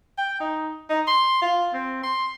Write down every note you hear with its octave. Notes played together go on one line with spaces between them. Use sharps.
G5
D#4
D#4
C6
F4
C4
C6